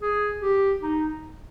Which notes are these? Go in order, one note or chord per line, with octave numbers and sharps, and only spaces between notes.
G#4
G4
D#4